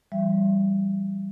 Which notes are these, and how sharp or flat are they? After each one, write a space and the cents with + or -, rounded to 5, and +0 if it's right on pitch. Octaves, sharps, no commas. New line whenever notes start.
E3 +45 G3 +0 E5 +30